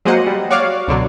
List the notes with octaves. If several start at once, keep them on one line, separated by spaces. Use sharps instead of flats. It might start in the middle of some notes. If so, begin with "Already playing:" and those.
F#3 G#3 A#3 C5 D#5 F#5
G3
F#4 C#5 D5 F5
C#2 B2 D3 F#3